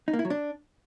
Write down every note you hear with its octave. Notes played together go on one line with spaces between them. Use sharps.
D#4
A#3
E4
F#3
D4